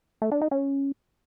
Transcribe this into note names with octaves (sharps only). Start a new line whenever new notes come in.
A3
D4
D#4
C#4